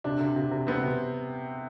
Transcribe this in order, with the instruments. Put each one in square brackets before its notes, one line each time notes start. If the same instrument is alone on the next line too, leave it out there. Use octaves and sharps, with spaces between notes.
[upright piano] C3 [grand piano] D4
[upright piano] C3
C3
C3
[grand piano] B3 [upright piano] C4
[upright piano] C3